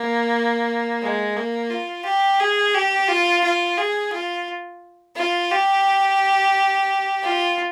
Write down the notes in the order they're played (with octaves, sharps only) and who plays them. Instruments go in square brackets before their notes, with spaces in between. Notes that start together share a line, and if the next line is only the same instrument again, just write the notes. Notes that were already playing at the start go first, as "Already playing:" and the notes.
Already playing: [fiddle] A#3
G#3
A#3
F4
G4
G#4
G4
F4
F4
G#4
F4
F4
G4
F4